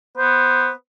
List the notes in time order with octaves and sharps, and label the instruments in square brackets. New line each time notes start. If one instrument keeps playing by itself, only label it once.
[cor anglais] B3 [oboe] C5